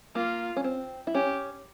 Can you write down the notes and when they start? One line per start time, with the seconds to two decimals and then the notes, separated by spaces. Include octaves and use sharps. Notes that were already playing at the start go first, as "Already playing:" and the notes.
0.15 A#3 F4
0.57 C#4
0.64 C4
1.07 E4
1.15 C#4 G4